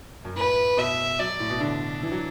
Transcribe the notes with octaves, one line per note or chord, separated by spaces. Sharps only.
F#2
A2 B4
B2 E5
F#3 D5
A2
B2
D3 D4
E3
F#3